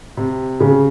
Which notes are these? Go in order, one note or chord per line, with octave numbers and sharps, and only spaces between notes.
C3
C#3